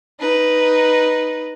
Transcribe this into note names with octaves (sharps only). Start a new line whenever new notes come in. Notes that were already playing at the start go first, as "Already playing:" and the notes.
D#4 B4